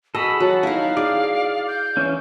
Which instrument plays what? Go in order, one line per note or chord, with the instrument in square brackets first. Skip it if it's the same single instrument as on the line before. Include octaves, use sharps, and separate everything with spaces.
[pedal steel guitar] F#4 G#4 A4 [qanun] D#5 [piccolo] B5
[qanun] F#3 [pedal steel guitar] F#5 [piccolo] A5
[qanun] D#4 E4 [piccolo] F5
[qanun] G#4 [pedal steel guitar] D5
[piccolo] G6
[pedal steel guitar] E3 C#4